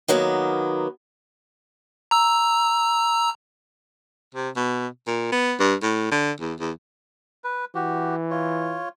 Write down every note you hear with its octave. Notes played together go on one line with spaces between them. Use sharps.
D#3 F#3 A#3 B3
A#5 E6
C3
B2
A#2
B3
G2
A2
D3
E2
E2
B4
E3 F#4 G4
F4 C#5